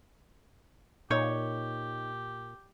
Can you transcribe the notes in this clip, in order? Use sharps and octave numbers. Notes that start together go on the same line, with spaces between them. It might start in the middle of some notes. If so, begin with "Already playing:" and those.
A#2 D#4 G4 C#5